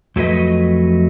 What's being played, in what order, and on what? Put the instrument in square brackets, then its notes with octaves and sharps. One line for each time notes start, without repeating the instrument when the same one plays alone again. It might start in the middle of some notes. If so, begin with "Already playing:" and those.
[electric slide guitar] F2 F#3 A3 B4 D#5